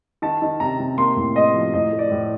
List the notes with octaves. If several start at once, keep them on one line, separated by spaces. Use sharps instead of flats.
D#3 A5
D#3
C3 A#5
C3
A#3 C6
A2
A2 D#5
F3
A2 D#5
A3
D5
A2